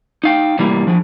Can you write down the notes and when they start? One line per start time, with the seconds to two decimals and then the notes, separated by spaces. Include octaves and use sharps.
0.24 D#4 F5 G5
0.59 A2 C3 E3 G3 A#3
0.87 F3 D4 G#4